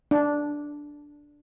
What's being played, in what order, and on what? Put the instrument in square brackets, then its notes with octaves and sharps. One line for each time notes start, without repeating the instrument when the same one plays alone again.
[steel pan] D4